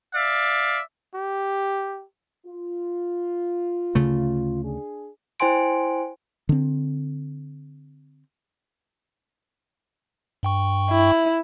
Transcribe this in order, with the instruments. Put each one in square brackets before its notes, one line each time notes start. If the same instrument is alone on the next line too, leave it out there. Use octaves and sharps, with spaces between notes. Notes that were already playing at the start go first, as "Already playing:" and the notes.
[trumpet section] D5 E5 F5
[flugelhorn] G4
[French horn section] F4
[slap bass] D2 C#3 A3
[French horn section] D4 G#4
[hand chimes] E4 C5 G5 G#5 C6 D7
[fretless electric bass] D3 C4
[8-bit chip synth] G2 G5 C#6
[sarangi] E4